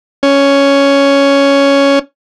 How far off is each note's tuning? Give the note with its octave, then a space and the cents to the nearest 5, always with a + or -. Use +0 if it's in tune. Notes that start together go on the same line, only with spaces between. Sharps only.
C#4 +5